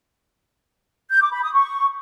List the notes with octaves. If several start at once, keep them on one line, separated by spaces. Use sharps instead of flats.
G6
D6
B5
D#6
C#6